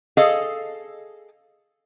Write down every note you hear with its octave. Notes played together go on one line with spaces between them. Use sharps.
G#4 A4 D#5 F5